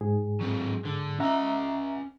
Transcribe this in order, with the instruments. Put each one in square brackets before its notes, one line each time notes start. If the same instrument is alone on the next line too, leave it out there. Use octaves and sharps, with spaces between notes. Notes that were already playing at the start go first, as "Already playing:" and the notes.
[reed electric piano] G#2 G#4
[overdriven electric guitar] F#3 C4
D3
[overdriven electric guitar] C#4 D#5 [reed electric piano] E5 F#5 A#5